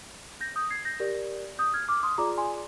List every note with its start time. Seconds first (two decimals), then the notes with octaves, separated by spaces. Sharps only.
0.41 G6 A#6
0.56 D#6 G6
0.70 G#6 C7
0.85 G6 A#6
1.00 G4 A#4 D5
1.59 D#6 G6
1.74 F6 G#6
1.89 D6 F6
2.03 C6 D#6
2.18 F4 G#4 D5 A#5 D6
2.38 G#5 C6